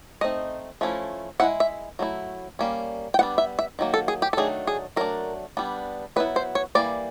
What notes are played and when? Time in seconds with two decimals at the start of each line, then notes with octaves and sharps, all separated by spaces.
0.21 A3 C4 D#4 D#5
0.81 F3 A3 C#4 E4
1.40 G#3 C#4 E4 F#5
1.60 E5
1.99 F#3 A3 E4
2.59 G3 A#3 C#4
3.14 G5
3.19 G3 B3 D4 F#5
3.38 E5
3.59 E5
3.79 D#3 F#3 A#3
3.94 A4
4.08 G#4
4.22 G4
4.33 A4
4.37 D#3 F#3 A3 D4 G#4
4.67 G#4
4.96 F#3 A3 D4 A#4
5.57 G3 B3 D4
6.16 F#3 B3 E4 B4
6.36 C5
6.55 C#5
6.75 E3 G3 A#3 D5